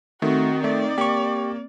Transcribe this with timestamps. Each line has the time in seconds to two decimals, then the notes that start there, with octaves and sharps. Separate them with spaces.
0.22 D#3 A3 C4 F#4
0.64 A3 D5
0.98 A#3 G4 C#6